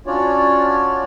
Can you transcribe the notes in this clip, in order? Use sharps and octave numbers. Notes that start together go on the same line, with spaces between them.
C#4 D4 F4 F#4 C#5 D5